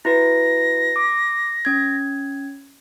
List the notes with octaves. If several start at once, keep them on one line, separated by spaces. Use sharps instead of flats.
E4 F#4 B4 A#6
D6
C#4 G#6